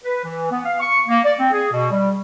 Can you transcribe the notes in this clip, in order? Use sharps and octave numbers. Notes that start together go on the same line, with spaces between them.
B4
E3
B3
F5
C#6
A#3
D5
C4
G#4
B2
G3